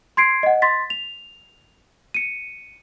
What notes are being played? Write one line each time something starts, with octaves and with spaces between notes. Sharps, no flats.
C6 G#6 C7 D7
D#5 F#5
C6 A6 B6
F7
C#7 D#7